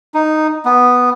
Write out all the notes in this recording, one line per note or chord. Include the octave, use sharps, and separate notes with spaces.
D#4
B3